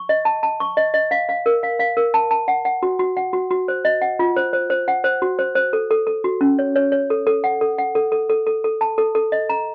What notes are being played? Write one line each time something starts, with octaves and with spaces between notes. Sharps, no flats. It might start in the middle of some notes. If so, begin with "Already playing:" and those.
Already playing: C#6
D#5
A5
A5
C#6
D#5
D#5
F5
F5
A#4
F5
F5
A#4
A5
A5
F#5
F#5
F#4
F#4
F#5
F#4
F#4
C5
D#5
F#5
F4
C5
C5
C5
F#5
C5
F#4
C5
C5
A4
A4
A4
F#4
C#4
C#5
C#5
C#5
A4
A4
F#5
A4
F#5
A4
A4
A4
A4
A4
A5
A4
A4
D#5
A#5